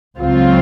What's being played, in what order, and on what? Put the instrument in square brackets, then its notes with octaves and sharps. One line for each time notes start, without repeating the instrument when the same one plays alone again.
[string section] C#2 C#3 F#3 C4 F4